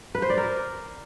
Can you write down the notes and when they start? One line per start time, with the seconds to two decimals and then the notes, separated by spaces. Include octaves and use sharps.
0.15 B4
0.22 C5
0.30 D5
0.37 A#4